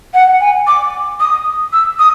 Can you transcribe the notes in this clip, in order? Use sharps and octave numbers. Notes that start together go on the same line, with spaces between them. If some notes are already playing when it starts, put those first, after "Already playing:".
F#5
G#5
D6
D#6
E6
D#6